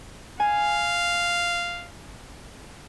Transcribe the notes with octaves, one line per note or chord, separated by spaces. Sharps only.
F5 G#5